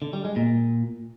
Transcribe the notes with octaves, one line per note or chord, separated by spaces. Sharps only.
D3
G3
G#3
A#2